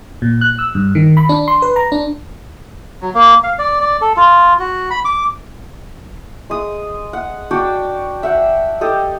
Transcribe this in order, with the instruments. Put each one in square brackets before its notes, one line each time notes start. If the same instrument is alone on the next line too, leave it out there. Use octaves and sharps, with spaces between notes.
[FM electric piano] A#2
F#6
E6
G2
D#3
B5
D4
C6
B4
A#5
D4
[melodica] F#3
A#3
F5
D5
D5
A4
F4
F#4
B5
D6
[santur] G#3 D#6
F#5
D4 F#4 D5 G5
E5 F#5 G5
G4 A4 D#5